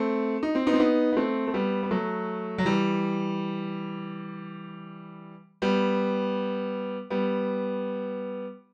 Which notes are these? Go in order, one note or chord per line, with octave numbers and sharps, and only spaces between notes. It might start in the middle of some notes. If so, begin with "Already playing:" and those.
Already playing: A3 C4
D#4
C4
B3 D#4
C4
B3 D#4
B3
A3 C4
A3
G3 B3
B3
F#3 A3
F#3
E3 G3
G3 B3
G3 B3